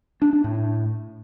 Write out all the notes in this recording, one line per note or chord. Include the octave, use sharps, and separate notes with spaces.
D4
D4
A2